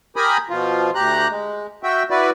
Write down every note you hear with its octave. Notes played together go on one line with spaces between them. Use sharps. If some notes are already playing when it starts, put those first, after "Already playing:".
G4 A#4 G#5 B5 D#6
B2 F3 F4
D2 G4 A#5 F#6
G#3
F#4 E5 G5
E4 F#4 B4 D5